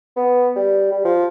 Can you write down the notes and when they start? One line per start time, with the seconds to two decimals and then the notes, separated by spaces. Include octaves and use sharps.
0.16 B3
0.56 G3
0.92 G3
1.05 F3